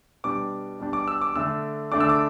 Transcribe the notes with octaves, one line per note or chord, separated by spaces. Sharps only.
B2 G3 D4 D6
B2 G3 D4
D6
E6
D6
D3 A3 D4 E6
D3 A3 D4 D6
E6
D6